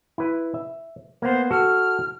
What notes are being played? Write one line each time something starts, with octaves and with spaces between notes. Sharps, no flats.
E4 B4
E5
A#3 B3 C5
F#4 A4 F6